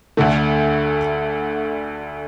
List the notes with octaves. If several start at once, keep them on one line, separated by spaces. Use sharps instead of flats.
D2 D3 A3